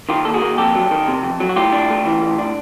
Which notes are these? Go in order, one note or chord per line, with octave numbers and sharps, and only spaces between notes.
D#3 F4 G4
D#2 A4
F#4 G#4
A#3
F2 G4 A4
F#3
D#3
C3
F2
F#3
F#4
A2 F4 G4
D4
A3
E3
A2
D4